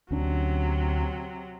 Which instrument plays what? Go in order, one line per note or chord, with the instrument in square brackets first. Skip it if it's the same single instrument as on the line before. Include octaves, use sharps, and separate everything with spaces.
[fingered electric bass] D2 C#4 D4 [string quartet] C3 F#3